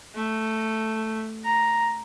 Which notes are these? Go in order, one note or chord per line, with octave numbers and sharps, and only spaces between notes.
A3
A#5